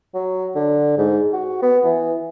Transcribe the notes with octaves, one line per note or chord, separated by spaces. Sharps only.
F#3
D3
G#2
F#4
B3
E3